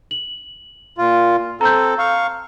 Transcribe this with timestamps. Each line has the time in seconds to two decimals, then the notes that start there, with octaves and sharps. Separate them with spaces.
0.11 F#7
0.98 A#2 F4
1.61 C4 A4 A#5 G6
1.99 F5 C#6